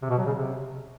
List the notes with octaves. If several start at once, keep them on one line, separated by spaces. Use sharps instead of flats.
C3
B2
F#3
C#3
C3